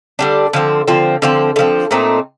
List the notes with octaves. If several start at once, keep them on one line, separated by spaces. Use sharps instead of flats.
D3 G3 D4
D3 F3 C4
D3 F3 C4
D3 F3 C4
D3 F3 C4
A#2 A3 C4 D#4